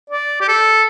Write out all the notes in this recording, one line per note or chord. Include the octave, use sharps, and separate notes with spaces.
D5
G4
A4